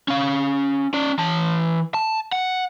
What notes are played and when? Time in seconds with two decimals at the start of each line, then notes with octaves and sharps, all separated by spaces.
0.08 C#4 F5
0.94 C#4 D5
1.19 E3 A5
1.94 A5
2.32 F#5